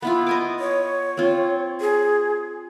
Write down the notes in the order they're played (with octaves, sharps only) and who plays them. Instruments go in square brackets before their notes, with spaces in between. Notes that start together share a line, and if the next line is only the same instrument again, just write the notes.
[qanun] B3 E4 F4 [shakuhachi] B5
[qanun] D#5 G#5 D6
[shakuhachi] C#5
[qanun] C4 F4
[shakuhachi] G#4